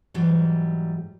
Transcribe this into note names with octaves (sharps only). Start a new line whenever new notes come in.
G#2 E3 F#3 G3